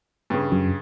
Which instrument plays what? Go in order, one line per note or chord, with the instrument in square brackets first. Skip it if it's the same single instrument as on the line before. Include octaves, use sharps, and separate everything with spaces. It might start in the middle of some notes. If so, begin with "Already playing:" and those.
[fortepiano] G2 C#3
[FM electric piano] F#2